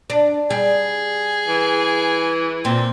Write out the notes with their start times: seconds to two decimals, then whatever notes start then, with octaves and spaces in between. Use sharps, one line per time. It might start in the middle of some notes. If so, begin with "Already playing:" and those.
0.10 D4
0.50 G3 G#4
1.48 E3
2.65 A#2 C4